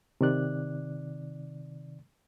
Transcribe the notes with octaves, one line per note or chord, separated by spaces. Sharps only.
C3 D#3 D5 F#6